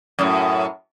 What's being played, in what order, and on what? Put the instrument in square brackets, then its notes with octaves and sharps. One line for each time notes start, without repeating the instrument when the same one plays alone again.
[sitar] F#2 A2